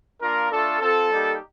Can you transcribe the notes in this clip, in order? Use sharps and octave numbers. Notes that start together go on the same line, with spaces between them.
A#3 D4 F4 A#4
A3 D4 F4 A4
C4 F4 A4
G3 A#3 D#4 G4